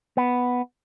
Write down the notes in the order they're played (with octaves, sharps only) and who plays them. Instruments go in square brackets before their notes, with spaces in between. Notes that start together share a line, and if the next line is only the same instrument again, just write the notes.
[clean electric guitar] B3